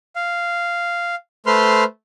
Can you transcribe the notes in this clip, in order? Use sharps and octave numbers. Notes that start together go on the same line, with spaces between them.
F5
A3 B4 C5 C6 F6